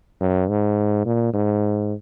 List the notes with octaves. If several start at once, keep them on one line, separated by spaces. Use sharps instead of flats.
F#2
G#2
A#2
G#2